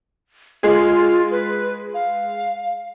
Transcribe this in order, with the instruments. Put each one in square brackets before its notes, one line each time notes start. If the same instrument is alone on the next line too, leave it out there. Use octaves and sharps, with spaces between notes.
[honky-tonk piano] G#3 G#4 [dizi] F4
[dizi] B4
F5